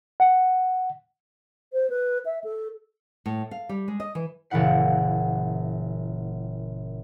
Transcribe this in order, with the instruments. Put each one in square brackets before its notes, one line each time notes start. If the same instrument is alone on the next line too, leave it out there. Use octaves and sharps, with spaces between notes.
[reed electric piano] F#5
[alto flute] C5
B4
E5
A4
[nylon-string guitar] A2
F5
G3
G#3
D#5
E3
[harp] F#1 A#2 E3 E4 F#5 C7